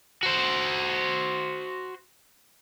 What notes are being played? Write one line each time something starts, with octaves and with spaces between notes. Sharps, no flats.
F#4 C5